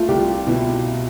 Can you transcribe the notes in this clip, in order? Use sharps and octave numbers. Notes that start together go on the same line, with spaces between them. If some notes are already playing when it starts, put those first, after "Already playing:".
Already playing: A3 F4
C2 G4
B2 E4